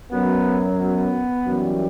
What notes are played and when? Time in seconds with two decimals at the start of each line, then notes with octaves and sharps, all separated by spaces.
0.10 F#2 F#3 B3
0.78 B3
1.46 F#2 E3 G3